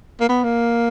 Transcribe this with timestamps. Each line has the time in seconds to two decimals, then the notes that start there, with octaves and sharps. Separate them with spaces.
0.21 A#3
0.29 B3
0.44 A#3